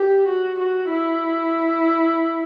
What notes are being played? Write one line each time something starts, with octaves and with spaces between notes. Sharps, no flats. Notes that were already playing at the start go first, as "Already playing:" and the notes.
Already playing: G4
F#4
F#4
E4